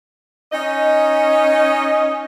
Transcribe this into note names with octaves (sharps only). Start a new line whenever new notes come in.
C#4 D#4 D#5